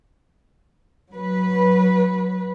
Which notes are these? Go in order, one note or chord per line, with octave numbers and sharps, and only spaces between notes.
F#3 B4